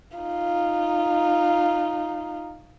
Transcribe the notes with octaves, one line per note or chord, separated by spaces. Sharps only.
D#4 F4